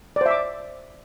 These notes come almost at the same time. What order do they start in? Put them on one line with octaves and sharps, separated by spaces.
D5 C5 E5 D6